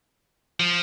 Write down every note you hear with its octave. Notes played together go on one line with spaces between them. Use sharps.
F3